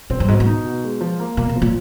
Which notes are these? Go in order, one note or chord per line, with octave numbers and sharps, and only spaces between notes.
A#2 C4
G2
G#2 B2
A2
D#4
B2
G#3
F3
A#3
A#2 A#3
B2
F3
A#2